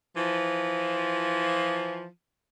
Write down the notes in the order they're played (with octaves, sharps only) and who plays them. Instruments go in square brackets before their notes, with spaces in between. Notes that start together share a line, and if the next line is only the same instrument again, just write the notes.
[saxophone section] E3 F3